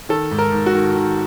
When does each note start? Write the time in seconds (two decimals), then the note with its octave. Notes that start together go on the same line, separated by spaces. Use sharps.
0.09 D#3 A4
0.31 G#2
0.38 A#4
0.52 G#2
0.66 F#4
0.73 D#3
0.95 D#3